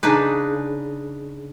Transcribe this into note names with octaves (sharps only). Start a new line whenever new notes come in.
C#3 D4 D#4 B4